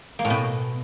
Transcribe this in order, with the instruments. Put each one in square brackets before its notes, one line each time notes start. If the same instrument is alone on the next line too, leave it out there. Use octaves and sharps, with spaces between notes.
[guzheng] A#3
A2
B2